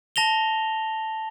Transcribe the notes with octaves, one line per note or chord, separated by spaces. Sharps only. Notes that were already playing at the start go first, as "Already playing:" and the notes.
A5 A#6 F7 G7